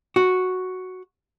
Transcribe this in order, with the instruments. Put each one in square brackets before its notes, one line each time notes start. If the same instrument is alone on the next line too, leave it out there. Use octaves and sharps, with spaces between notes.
[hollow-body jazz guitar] F#4